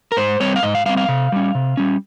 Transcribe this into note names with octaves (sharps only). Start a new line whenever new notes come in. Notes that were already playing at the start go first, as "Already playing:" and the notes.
A#4
G#2 C5
G3 C4 C#5
F5
G#2 D#5
F5
G3 C4 F5
F5
C3
G3 C#4
C3
G3 C#4